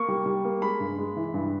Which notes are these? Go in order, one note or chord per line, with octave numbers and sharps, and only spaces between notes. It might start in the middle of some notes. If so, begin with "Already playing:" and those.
Already playing: A#3 C#6
G3
G3
A#3
G#3 B5
G2
G#3
E3
G2